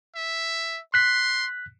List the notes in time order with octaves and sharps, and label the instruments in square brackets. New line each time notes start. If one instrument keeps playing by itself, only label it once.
[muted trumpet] E5
[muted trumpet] C6 [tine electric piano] F#6 B6